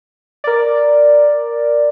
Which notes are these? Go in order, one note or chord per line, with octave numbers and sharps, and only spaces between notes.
A#4 D5